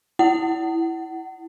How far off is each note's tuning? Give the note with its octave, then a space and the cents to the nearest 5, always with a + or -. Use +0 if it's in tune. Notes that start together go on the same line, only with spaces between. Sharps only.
E4 +0 F#5 +30